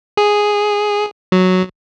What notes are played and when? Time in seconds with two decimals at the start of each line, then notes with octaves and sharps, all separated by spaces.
0.17 G#4
1.32 F#3